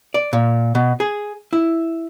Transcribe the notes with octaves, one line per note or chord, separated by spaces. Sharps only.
D5
A#2
B2
G#4
E4